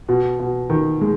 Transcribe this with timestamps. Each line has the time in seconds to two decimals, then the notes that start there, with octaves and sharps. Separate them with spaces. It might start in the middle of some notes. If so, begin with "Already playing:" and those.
0.09 B2
0.39 B2
0.70 D#3
1.01 G#3